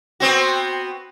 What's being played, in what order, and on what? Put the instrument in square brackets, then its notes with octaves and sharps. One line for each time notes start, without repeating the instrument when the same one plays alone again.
[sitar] B3 C4 F#4